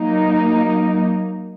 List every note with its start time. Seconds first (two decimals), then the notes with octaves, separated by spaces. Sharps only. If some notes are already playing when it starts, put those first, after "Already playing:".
Already playing: F#3 A#3 D#4